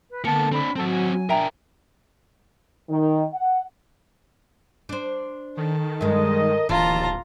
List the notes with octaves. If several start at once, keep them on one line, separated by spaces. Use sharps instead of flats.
B4
D3 A#3 B3 A5 C#7
C4 D4 B5
F#3 C4 F#4 A4
G#5
D4 A#4 E5 G5 A#5
D#3
F#5
D4 C5
D#3 A4
G2 G#3 A#4 D#5
D1 A#1 D#2 E3 F4 A5 A#5